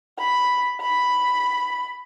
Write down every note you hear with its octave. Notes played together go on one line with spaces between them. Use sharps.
B5
B5